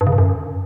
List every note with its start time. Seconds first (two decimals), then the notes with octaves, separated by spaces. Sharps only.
0.01 G2
0.07 C#3
0.12 G2
0.18 F#2